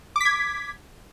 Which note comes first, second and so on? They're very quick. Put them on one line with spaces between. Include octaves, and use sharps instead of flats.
D6 B6 G#6